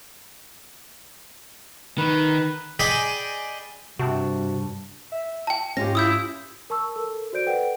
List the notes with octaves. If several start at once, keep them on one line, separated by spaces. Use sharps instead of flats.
D#3 B4
G#4 D5 D#5 G5 B5
G2 C3 F#4 A5
E5
G5 A5
G#2 C#4 F4 G4 A#6
E4 D#6 E6 G6
A#4 A5 C#6 E6
A4 A#4
F#4 C5 D5 G6 D7
A4 B4 D5 F#5 G5